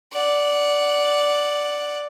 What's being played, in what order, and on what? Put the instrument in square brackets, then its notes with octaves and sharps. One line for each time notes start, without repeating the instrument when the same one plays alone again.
[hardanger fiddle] D5 F#5